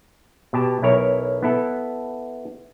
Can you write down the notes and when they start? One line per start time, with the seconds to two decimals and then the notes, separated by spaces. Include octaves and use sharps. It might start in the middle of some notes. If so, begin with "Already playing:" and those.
0.53 B2 G4 A5
0.82 B1 E4 A#4 C#5 A#5
1.43 B3 E4 A4